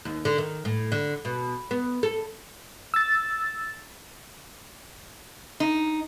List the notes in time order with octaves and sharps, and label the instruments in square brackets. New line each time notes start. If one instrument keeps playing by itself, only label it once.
[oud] D#2
D3
D#3
A2
D3
B2
B3
A4
[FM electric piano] E6 A6
[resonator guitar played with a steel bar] D#4